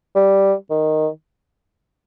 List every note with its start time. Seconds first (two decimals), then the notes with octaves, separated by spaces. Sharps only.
0.15 G3
0.70 D#3